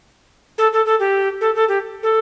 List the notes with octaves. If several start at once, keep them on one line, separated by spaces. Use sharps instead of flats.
A4
A4
A4
G4
A4
A4
G4
A4